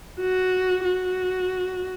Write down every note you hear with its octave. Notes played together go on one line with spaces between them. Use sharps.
F#4
F#4